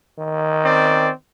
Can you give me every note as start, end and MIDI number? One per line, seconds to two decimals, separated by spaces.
0.18 1.09 51
0.65 1.11 60
0.65 1.11 61
0.65 1.11 74